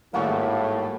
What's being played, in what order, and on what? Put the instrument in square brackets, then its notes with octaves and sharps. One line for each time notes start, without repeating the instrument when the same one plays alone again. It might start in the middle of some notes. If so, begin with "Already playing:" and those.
[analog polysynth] G#1 G3 A3 [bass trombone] A2 [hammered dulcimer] A#3 F#4 G#4 [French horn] E4